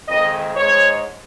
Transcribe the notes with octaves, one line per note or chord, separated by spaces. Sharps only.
F2 D#3 G#3 D#5
G#2 G#3 C#5